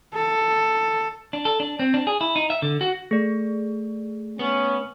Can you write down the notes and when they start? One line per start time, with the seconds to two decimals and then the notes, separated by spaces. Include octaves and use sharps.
0.15 A4
1.33 D4
1.45 A4
1.60 D4
1.79 C4
1.94 D4
2.07 G#4
2.21 E4
2.36 D#4
2.50 E5
2.62 D3
2.81 F#4
3.11 A3 G#4 D5
4.39 B3 C#4